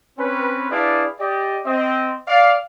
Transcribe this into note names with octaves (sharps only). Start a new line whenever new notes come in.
C4 C#4 B4
D4 E4 G#4 B4 D5 F5
G4 D5 D#5
C4 D#5
D5 F5